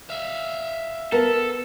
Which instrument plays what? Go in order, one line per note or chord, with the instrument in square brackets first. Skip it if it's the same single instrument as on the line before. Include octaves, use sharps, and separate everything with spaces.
[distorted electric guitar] E5 F5
[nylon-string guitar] B3 [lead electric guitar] A4 [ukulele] A#4